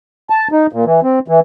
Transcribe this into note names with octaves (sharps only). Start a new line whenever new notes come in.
A5
D#4
A#2
E3
C4
E3